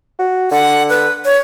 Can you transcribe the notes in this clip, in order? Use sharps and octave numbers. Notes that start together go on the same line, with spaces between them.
F#4
D3 F#5
B4
C#5